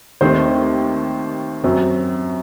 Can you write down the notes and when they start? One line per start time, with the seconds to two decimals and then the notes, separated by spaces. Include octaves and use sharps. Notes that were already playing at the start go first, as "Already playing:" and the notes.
0.21 D#2 D#3 A3 C4 C5
1.64 F#2 F#3 C4